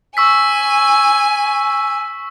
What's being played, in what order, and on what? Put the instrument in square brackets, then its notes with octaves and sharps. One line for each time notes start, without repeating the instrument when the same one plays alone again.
[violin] G#5 [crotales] C#6 E6 B6